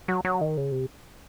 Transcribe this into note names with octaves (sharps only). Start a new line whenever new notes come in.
F#3
F#3
D#3
C#3
C3